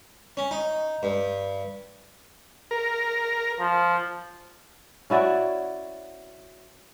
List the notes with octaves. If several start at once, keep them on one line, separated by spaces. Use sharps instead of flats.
C#4
D#4
G2
A#4
F3
C#4 E4 F#4 D5